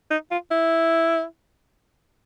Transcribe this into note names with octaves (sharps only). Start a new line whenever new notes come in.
D#4
F4
E4